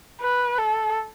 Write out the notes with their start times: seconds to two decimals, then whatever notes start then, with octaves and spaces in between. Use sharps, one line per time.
0.21 B4
0.58 A4